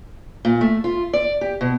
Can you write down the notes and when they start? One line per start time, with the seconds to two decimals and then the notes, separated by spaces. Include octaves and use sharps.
0.45 A#2
0.61 A3
0.84 F4
1.13 D5
1.41 G4
1.61 B2